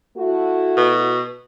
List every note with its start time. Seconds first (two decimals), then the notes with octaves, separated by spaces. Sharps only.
0.18 A3 E4 F#4
0.77 B2